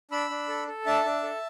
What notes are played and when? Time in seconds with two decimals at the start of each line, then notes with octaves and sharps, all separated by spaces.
0.11 D4 B5 E6
0.30 D4
0.49 A4
0.68 A4
0.86 D4 E5 A5
1.05 D4
1.23 A4